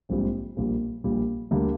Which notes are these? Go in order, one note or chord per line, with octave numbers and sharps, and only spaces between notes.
A#1 G#2 G3 C4 F4
A#1 A#2 G3
A#1 A#2 G3
D2 D3 G3 A#3